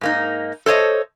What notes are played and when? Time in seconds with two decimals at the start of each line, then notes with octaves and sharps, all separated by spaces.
0.01 G#2 A#3 D#4
0.66 A4 C5 C#5 D#5